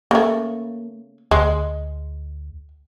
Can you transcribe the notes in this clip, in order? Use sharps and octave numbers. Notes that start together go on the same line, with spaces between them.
C#3 A3 A#3
D2 G#3